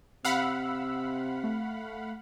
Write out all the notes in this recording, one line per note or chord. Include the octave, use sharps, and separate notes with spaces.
C3 F5 F#5 B5 E6
A3